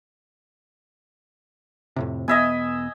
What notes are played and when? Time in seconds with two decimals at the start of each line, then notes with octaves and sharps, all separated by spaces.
1.96 F2 A2 C3
2.28 E1 B3 D#5 E5 G#5